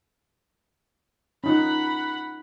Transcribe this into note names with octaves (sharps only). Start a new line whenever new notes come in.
C#4 D#4 F4 F#5 B5